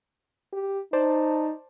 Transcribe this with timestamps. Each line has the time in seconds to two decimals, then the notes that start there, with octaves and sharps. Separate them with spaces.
0.53 G4
0.93 D#4 C5 D5 A5